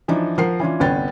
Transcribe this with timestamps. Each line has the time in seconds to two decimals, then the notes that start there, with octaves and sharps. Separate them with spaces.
0.08 E3 F3 D4 D#4
0.38 F3 A#4 F#5 C7
0.60 E3 C#4 D4 F4
0.80 G1 C2 B3 C#4 G5 A6